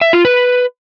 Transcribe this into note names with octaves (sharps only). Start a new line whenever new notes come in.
E5
F4
B4